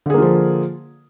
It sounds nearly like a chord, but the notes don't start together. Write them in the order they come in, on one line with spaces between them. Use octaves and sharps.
D3 G#4 A#3 F4 F3